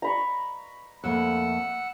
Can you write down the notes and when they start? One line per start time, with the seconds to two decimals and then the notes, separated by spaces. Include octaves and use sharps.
0.02 A#5 B5 C#6
1.04 F2 A3 A#3 F#5 E6 F#6